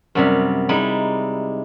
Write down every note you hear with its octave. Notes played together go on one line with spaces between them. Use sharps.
F#2 C3 G3
G3 G#3 D#4 E4